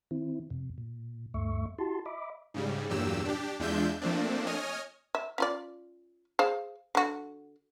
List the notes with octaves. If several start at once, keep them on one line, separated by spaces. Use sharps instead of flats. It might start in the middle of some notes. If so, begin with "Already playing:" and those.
D#3 C4 E4
F2 C3
A#2
D2 G2 A3 E5 C#6
E4 F#4 G4 A5 C6
D#5 E5 B5 D6
G#2 C#3 G3
E2 G2 A#2 F#3 G4 E6
D4 G4
E2 G#3 D4 F4 E5 G6
F3 A3 A#3 C4 D4
C#5 D#5 G#5 D#6 F6
E5
C#4 F4 D5
G#4 C5 F5
D3 F#4